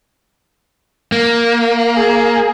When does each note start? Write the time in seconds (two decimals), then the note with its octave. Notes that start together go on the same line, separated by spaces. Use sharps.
1.12 A#3
1.96 G#4